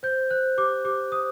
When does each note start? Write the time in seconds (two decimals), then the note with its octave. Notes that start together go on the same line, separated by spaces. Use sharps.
0.03 C5 G6
0.31 C5 F#6
0.58 G4 D6
0.85 G4 D6
1.12 C5 D#6